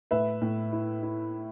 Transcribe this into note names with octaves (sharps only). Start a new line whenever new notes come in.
A2 B4 E5
A2
E4
E4